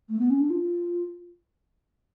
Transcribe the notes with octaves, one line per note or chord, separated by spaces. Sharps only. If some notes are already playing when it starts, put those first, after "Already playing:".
A3
B3
C#4
D4
F4